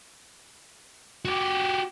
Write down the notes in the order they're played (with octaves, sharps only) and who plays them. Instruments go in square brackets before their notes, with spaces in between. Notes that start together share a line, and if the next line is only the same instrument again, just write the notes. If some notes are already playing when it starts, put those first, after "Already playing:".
[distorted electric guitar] F#4 G4